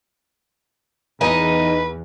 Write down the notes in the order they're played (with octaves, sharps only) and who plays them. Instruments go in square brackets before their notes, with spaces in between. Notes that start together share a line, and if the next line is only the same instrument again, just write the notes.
[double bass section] E2 [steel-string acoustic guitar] D#4 D#5 G#5 [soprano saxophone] B4